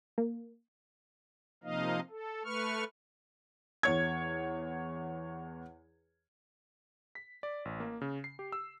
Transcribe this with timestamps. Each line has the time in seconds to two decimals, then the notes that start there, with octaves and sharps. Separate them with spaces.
0.18 A#3
1.64 C3 F3 A#3 D#4 D#5 F5
2.10 A4
2.44 A3 B4 C#6 F6
3.83 E2 C#5 G#6
7.15 B6
7.43 D5
7.65 A1
7.80 A#3
8.01 C#3
8.24 C7
8.39 G4
8.52 E6